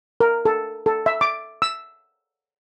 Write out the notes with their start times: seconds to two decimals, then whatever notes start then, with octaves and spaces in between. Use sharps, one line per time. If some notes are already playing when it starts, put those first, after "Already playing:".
0.20 A#4
0.45 A4
0.86 A4
1.06 E5
1.21 D6
1.62 E6